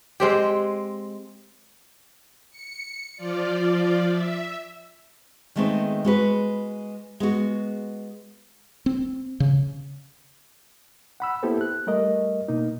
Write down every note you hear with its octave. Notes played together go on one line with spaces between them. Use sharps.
G#3 C4 G4
C#7
F3 F4 D5
E5
D#3 G#3 A3 B3 C4
G#3 F#4 B4
G#3 B3 F#4
C4
C#3
F#5 B5 E6
A#3 B3 E4 G4 A4 C5
F#6
G3 A3 A#4 D#5
B2 A#3 D#4